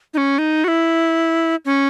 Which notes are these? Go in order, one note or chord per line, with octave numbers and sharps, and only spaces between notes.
D#4
C#4
D#4
F#4
E4
C#4